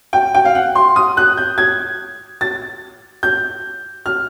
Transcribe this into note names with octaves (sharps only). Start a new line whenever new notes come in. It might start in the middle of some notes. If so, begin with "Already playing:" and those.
G5
G5
F5
F#5
C6
D#6
F#6
G6
G#6
A6
G6
F6